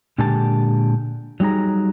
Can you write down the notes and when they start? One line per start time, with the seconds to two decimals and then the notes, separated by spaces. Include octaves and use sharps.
0.18 A#2 D3 G#3 G4 G#5 A5
1.40 F#3 G3 D#4 G#4 A#5